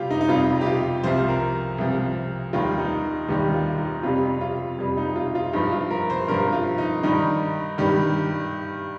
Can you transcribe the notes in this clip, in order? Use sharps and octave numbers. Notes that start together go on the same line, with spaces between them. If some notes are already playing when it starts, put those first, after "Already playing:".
Already playing: C3 G3 F4 G4
D#4
D#4
F2 C3 G3 F4
G4
F4
C2 C3 F3 C5
A#4
C2 C3 F3
D#2 D#3 G3 F4
D#4
D#2 D#3 G3 G4
F4
D#4
F2 C3 G3 F4
F4
F2 C3 G3
D#4
F4
F4
G2 F3 D#4
F4
A#4
C5
G2 F3 A#4
F4
D#4
G2 D#3 G3 D#4
G2 D#3 G3 G4